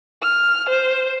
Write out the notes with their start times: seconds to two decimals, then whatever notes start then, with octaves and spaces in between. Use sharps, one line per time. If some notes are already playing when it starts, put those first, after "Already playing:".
0.22 F6
0.69 C5